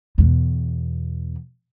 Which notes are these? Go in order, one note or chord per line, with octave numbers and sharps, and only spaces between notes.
E2 B2